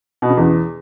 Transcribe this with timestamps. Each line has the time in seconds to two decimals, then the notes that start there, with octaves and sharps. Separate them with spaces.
0.22 B2
0.30 C#3
0.37 E2